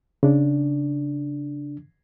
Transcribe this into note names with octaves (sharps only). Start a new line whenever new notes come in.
C#3 D4